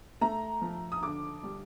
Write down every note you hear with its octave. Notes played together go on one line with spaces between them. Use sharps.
A3 A#5
F3
D#6
D3 D6
G3